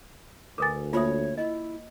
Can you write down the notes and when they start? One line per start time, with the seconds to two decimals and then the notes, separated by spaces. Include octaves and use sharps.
0.58 D2 A#4 B4 G#5 D6 D#6 A6
0.93 A#3 F4 C5 C#5 E5 D#6
1.38 E4 D#5